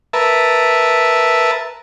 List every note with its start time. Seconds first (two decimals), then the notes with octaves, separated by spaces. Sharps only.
0.13 A#4 B4 E5 A5